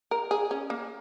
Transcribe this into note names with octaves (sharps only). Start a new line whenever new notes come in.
A#4
G#4
C#4
A#3